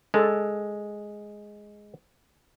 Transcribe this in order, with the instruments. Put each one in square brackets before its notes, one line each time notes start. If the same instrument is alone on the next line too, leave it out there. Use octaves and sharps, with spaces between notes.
[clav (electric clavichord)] G#3 [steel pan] D4 A4 A5